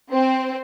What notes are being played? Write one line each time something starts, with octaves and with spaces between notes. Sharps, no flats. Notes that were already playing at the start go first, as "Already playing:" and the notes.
C4